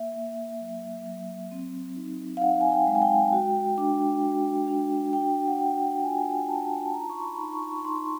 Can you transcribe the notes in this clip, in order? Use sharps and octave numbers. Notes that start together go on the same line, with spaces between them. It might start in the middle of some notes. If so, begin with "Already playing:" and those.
Already playing: A#3 E5
A#3
F#3
F#3
C4
D#4
F5
D#4 F#5
G#5
G5
G#3
G#5
G5
F#4
D4
F#4
D4
D4 G5
F#5
D4 G5
F4 G#5
F4 A5
A5
D#4 A#5
C#6
C6
B5
D#4
C#6
C#6
D#4 C6
C6